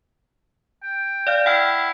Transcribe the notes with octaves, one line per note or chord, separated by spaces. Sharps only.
G5
D5 F5 F6
E4 F#5 G5 F6